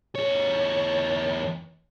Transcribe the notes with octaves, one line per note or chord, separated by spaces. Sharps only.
E2 C#5